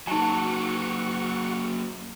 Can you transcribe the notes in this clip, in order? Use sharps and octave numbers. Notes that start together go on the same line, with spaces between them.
F#3 A#3 D#4 F#4 G#5 C#6